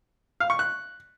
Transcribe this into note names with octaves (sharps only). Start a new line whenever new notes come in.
F5
C#6
F#6